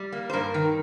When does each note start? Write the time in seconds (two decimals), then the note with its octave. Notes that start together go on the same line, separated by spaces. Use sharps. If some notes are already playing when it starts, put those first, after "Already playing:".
Already playing: G3
0.12 A#3
0.30 C5
0.33 G2 A#4
0.54 D#3